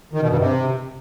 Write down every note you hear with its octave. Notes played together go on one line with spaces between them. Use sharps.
D#3
B2
G2
C3